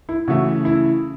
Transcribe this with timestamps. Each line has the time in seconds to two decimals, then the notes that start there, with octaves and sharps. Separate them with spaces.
0.09 E4
0.28 C#3 E3 A3 F#4
0.65 E4